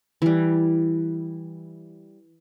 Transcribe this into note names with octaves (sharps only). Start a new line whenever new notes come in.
E3 G3